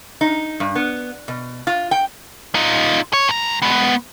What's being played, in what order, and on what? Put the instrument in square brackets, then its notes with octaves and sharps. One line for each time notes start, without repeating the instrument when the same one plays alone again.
[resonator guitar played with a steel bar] D#4
G2
B3
B2
F4
G5
[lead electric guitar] D#4 F4
C#5
G2 A#5
G#3 B3